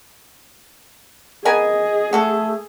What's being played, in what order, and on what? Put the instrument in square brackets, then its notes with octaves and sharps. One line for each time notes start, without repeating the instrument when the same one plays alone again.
[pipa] B3 A#4 G#5 [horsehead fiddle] G#4 [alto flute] D#5
[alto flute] A3 [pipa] F#4 A4